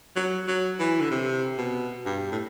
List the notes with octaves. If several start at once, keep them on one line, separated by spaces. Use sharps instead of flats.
F#3
F#3
E3
D3
C3
B2
G2
A2